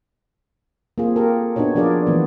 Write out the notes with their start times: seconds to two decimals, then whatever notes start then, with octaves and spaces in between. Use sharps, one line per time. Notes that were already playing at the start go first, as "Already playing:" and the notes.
0.98 A#3 C4 F4 G#4
1.16 G4 A4 A#4
1.56 B3 D4 D#4 F#4 C#5
1.75 F3 D4 F4 G#4 A#4 D5
2.07 E3 A3 B3